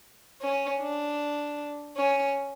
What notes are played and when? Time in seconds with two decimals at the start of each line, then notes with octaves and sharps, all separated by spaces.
0.42 C#4
0.81 D4
1.97 C#4